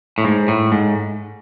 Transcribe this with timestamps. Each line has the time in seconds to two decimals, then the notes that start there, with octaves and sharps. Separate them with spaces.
0.18 A2
0.24 G#2
0.48 A2
0.72 G#2